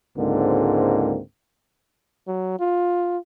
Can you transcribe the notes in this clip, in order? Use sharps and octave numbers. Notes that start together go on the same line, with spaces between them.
C#2 G#2 D3 A#3 C4
F#3
F4